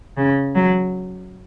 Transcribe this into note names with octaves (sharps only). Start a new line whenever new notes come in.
C#3
F#3